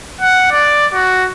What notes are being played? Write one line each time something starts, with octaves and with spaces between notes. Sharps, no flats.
F#5
D5
F#4